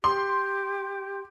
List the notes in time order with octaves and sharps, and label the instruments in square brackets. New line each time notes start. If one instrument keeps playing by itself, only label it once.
[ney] G4 [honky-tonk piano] C6